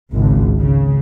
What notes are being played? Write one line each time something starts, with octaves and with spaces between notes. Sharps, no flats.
G#1 C#2
C#3